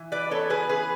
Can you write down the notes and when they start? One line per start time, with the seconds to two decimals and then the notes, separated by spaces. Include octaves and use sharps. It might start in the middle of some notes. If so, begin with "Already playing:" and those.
Already playing: E3
0.12 B4 D5
0.31 B3 A4 C#5
0.50 G#4 B4
0.69 E3 G#4 B4